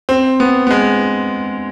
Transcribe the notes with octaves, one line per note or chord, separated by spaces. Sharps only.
C4
B3
B3
G#3